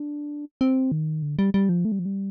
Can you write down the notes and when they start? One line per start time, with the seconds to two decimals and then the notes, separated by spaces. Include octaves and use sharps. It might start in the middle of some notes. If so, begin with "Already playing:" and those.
Already playing: D4
0.61 C4
0.92 D#3
1.22 D3
1.39 G3
1.54 G3
1.69 F3
1.85 A3
1.92 G3
1.99 F3
2.06 G3